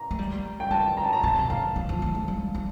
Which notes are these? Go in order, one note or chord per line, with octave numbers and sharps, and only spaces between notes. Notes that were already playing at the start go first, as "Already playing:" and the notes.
Already playing: A#5
A3
G3
G5
G3 A5
A#5
A5
A#5
C3 A5
D3 F5
D#3
F3
A3
A3
G3
G3